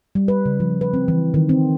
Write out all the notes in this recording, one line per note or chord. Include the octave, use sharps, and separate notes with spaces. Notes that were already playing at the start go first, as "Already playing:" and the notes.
G3
B4
C#3
F3
B4
C4
E3
D#3
C4